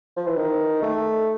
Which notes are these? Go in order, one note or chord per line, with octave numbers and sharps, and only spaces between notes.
F3
E3
D#3
A3